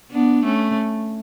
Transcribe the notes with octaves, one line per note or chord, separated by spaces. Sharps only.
B3 D4
A3 C#4